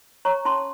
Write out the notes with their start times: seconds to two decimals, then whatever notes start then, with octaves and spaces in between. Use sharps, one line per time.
0.25 C#5 A#5 C#6
0.45 C#4 A5 C6